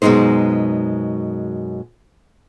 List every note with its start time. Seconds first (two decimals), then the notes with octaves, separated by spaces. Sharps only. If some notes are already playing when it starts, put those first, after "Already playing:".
0.02 F#2 B2 F3 G#3 D#4 C5